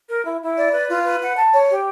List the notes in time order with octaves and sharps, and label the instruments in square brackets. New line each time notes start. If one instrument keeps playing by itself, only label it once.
[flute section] A#4
E4
E4
D5
B4
F4
B4
F#5
A5
C#5
G4